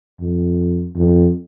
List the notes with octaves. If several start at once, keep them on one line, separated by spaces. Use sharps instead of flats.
F2
F2